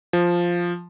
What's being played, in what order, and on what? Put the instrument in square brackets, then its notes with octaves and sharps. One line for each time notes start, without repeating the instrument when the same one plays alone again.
[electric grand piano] F3